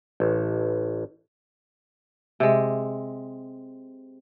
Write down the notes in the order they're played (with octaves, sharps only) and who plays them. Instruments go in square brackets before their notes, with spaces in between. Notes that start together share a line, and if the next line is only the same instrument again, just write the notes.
[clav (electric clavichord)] A1
[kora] C3 G#3